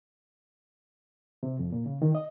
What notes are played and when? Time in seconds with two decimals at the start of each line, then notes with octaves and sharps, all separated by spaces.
1.43 C3
1.59 F2
1.72 A#2
1.86 C#3
2.02 D#3
2.15 D#5